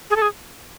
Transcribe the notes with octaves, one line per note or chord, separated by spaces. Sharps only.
G#4
A4
G#4